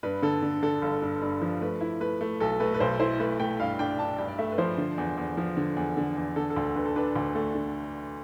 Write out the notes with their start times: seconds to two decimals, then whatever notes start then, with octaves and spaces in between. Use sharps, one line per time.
0.03 G2 B4
0.22 D3 A4
0.42 D3
0.63 D3 A4
0.82 G1 A4
1.02 G2
1.22 G2
1.42 F3
1.61 A3 B4
1.81 E4
2.00 A3 B4
2.21 A3
2.40 B1 A4
2.60 A3 B4
2.74 B4
2.80 B1 C5
3.00 E4 C5
3.20 A3 B4
3.40 A3 G5
3.59 G2 F5
3.79 D4 G5
3.99 D4 A5
4.18 G2 G5
4.28 D5
4.38 A3 E5
4.52 B4
4.58 F3 C5
4.78 D3
4.98 E2
5.17 E2
5.37 F3
5.57 D3
5.76 E2
5.97 D3
6.17 E2
6.36 D3 A4
6.50 A4
6.56 D2
6.76 D3 B4
6.86 A4
6.96 D4 B4
7.16 D2
7.35 A3
7.55 D3